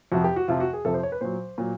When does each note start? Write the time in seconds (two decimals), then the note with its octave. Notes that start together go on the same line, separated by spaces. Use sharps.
0.12 F2 C3 F3 F#4
0.24 G4
0.36 F#4
0.48 F2 C3 F3 F4
0.60 F#4
0.73 G#4
0.85 F2 C3 F3 A4
0.94 C5
1.03 C#5
1.12 B4
1.21 A#2 F#3 C5
1.58 A#2 F#3